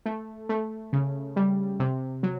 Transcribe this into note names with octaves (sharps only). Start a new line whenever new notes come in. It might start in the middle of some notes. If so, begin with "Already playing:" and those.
A3
A3
C#3
G3
C3
F#3